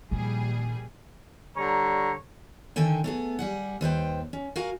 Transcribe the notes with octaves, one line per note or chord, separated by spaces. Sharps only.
A#1 A#2 D#3 G3 G#4
D3 G3 C#5 A#5
D3 D#3 A4 G5 G#5
A3 B3 G#4
G3 G#4 F#5
D#2 B4 C5 G5
C#4
F#4 A#4 F5 G#5